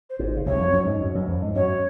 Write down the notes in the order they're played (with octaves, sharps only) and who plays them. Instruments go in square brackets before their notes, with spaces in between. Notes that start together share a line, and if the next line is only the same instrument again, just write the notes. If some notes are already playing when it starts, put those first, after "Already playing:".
[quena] C5
[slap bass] G#1 G#2
C#3
[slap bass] C2 C3 [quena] C#5
[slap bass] F2 F3
F#2 F#3
G#2 G#3
F#2 F#3
F#2 F#3
F2 F3
G#2 G#3
[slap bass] F#2 F#3 [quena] C#5